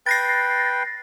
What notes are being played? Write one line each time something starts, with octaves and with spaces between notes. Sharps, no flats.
B4 G5 A6 A#6 C7